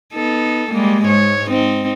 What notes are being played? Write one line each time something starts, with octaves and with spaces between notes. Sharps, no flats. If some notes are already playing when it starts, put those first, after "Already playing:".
B3 D#4 A4
G3 G#3 A#3
G#2 C#5
C4 D#4